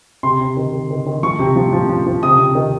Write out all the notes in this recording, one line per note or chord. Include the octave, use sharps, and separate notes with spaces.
C3 C6
C3
D#3
D#3
D#3
D#3
F3 C#6
C3
F3
F3
F3
F3
C3 D#6
C3
D#3